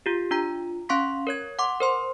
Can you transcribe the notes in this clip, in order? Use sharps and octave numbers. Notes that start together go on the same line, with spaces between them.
F4 G4
D4 F4 A#5
C#4 F5 C6 C#6 B6
A#4 C#5 G#6
F#5 C6 D6
A#4 C5 C6